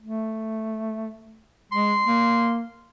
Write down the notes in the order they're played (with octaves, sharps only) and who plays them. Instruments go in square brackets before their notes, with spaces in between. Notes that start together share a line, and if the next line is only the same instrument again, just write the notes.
[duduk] A3
[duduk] G#3 [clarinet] C6
[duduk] A#3